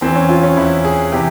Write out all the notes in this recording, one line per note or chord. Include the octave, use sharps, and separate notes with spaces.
E2 E3 C4
C#4
F4
C#4
E2 E3 E4
G#4
C3 E3 G4